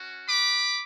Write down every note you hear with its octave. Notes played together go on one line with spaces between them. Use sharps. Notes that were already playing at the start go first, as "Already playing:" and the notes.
Already playing: C#4 F#4
B5 D6